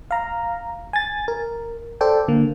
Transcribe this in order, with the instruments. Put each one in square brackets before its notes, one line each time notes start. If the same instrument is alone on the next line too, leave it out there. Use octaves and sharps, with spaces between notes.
[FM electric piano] F5 A#5
G#5 A6
A#4
A4 C5 D5 G5
D3 A#3